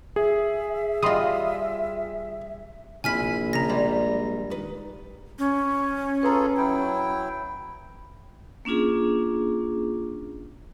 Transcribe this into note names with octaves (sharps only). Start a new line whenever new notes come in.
G#4 E5
G3 F4 D#5 C6 D#6
A#1 C3 E4 G#5 B5 F6 B6
C#3 F3 A#5 A#6
G3 G#3 C5 D5 B5
D#3 B4
C#4
F4 G#4 A4 B4 A#5
F#3 E4 G5
A#3 C#4 D4 F4 G#4